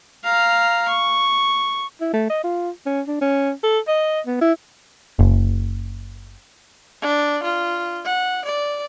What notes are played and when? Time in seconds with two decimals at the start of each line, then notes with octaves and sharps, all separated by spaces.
0.24 F5 A#5
0.88 C#6
2.01 E4
2.14 A3
2.30 D#5
2.44 F4
2.86 C#4
3.07 D4
3.21 C#4
3.64 A4
3.88 D#5
4.26 B3
4.41 E4
5.19 F#1
7.02 D4
7.43 F4
8.05 F#5
8.45 D5